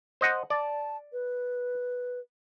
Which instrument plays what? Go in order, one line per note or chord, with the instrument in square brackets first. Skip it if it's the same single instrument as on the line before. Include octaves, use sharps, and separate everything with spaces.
[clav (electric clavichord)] C5 D#5 F#5
[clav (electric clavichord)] D5 [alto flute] A5
[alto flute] B4